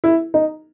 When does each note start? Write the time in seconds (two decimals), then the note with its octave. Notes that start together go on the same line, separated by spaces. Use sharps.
0.04 E4
0.34 D#4